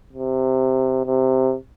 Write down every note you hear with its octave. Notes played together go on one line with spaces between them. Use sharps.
C3
C3